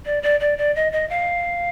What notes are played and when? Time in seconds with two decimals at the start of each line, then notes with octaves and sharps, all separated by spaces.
0.05 D5
0.23 D5
0.40 D5
0.58 D5
0.75 D#5
0.92 D#5
1.09 F5